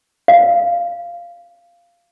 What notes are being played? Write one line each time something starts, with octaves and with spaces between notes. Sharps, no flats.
F5